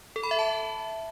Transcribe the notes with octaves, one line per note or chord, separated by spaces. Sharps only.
A4
B5
E5
A5